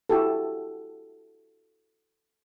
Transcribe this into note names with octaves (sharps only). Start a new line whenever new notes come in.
E4 F#4 G4 A4